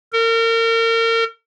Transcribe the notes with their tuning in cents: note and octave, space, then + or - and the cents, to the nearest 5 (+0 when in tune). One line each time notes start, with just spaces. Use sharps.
A#4 -35